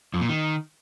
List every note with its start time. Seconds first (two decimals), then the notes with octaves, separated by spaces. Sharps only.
0.14 F2
0.21 A#2
0.29 D#3